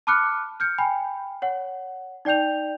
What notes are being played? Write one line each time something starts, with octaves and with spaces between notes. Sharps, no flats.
A5 B5 D6 F6 F#6 C#7
F6 G6 C#7
G5 G#5 B5
C#5 F#5
D#4 D5 G5 G6 F7